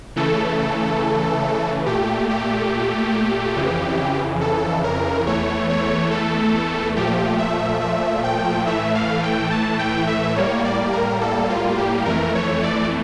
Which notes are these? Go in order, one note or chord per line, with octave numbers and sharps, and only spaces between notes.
C#3 E3 A3 A4
A#2 A3 G4
G4
F2 C#3 E3
A4
A#4
E2 E3 A3 C#5
C#5
A4
A#2 F3 A3 G4
E5
E5
G5
A2 E3 A3 E5
F5
G5
A5
G5
E5
A2 G3 A#3 C#5
D5
A#4
A4
F4
G4
F2 E3 A3 A#4
C#5
D5